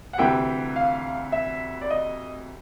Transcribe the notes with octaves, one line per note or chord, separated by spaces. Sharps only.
F#5
D2 C3 E3 G5
F5
E5
D5
D#5